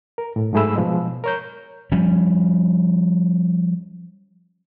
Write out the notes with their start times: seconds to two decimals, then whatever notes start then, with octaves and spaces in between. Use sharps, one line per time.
0.18 A#4
0.36 A2
0.53 G#2 F#3 A3 G#4 B5 E6
0.76 B2 F3 G#3
1.24 A#4 C#5 G6
1.92 F3 G3 C#4